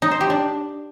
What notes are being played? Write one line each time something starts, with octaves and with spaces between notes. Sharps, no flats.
D#4
C5
G4
D4